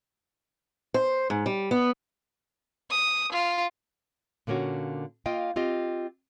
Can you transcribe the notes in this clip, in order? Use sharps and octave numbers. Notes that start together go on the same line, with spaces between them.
C5
G#2
G3
B3
D#6
F4
A#2 D3 A#3 C#4 F#4
A#3 F4 D#5 F5 G5
C4 F4 G4 D#5